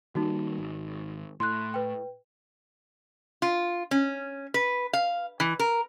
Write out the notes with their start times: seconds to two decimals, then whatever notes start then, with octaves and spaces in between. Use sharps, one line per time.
0.15 D#3 G3 A#3 D#4 F#4
0.58 G#1
1.40 A2 C6 F#6
1.74 B4 G5
3.42 F4
3.91 C#4
4.54 B4
4.93 F5
5.40 E3
5.59 A#4